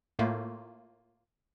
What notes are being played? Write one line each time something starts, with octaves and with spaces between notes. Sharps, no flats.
A2 A3 A#3 F4